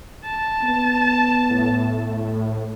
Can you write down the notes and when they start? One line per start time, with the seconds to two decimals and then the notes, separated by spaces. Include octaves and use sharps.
0.24 A5
0.64 B3
1.50 A2